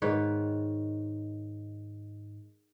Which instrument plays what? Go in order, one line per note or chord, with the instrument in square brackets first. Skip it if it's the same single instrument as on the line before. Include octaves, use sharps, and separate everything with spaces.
[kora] G#2 D#3 B4 C#5